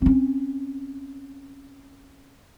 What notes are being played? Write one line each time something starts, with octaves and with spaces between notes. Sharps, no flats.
C4 C#4